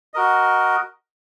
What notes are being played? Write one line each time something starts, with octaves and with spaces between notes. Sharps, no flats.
F#4 A#4 D#5